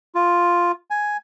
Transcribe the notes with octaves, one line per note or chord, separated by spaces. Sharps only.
F4
G#5